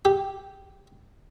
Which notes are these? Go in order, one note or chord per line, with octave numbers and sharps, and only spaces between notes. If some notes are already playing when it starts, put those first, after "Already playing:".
G4